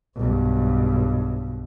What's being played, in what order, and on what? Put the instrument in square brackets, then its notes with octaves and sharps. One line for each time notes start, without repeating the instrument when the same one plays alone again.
[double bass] B1 G2